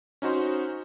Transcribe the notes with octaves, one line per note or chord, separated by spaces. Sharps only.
C#4 D#4 F#4 C5